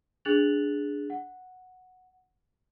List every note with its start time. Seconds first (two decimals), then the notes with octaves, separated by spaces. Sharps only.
0.25 D4 G#4 F#6 A6 F7 F#7
1.10 F#5